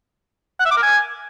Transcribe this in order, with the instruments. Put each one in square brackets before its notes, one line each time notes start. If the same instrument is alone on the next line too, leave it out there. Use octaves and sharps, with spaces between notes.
[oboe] F#5
E5
D6
A#4
G#5